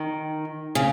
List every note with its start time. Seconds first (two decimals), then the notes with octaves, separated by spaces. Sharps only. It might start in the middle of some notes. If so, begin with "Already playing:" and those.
Already playing: D#3
0.75 C#3